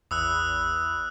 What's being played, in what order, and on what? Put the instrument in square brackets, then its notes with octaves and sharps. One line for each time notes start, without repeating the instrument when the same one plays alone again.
[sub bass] A1 [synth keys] E2 B5 [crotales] D#6 E6 F#6